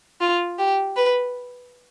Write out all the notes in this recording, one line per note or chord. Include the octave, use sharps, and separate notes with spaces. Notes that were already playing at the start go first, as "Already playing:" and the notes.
F4
G4
B4